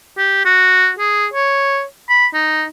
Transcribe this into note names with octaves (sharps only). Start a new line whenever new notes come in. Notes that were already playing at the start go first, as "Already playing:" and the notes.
G4
F#4
G#4
C#5
B5
D#4